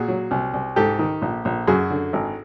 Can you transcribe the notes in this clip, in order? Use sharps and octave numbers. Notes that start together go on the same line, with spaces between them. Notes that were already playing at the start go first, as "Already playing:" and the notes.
Already playing: A#2 F#4 G#4
F#3
C2
C2
G#2 G4 A4
D#3
A#1
A#1
F#2 F#4 G#4
D3
G#1